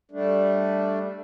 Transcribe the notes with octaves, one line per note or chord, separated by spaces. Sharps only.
G3 A3 D4